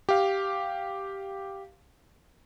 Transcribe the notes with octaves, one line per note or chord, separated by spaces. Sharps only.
G4 F5